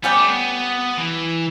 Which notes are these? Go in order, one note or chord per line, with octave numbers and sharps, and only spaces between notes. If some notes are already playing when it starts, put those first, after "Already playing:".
G3 B3 C#4 G4
A3
B3
E3